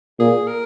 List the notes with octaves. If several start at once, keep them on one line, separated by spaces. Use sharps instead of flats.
A#2 G#4
A#4